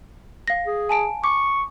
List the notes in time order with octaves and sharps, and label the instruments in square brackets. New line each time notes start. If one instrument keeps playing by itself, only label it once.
[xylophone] F5 A#6
[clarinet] G#4
[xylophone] G#5 A5 D7
[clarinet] C#6 [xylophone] D6